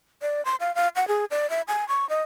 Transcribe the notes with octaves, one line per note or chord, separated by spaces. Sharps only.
D5
C6
F5
F5
F#5
G#4
D5
E5
G#5
C#6
D#5